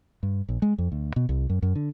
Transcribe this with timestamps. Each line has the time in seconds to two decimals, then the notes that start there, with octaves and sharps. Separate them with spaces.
0.23 G2
0.49 A#1
0.62 G#3
0.78 F2
0.92 D2
1.16 B2
1.29 C2
1.50 F#2
1.62 F#2
1.76 D3